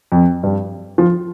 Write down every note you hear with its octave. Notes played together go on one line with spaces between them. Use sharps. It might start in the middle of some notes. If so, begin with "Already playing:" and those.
F2
G2
F3